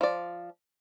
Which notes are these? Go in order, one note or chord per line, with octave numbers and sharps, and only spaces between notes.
F3 D5